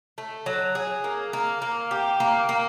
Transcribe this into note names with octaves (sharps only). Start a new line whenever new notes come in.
A3
F#3
G#4
A#3
A#3
A#3
G4
A#3
A#3